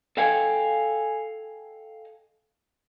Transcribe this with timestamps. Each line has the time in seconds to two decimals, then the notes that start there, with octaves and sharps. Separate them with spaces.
0.17 A4 D#5 F5 G5 G#5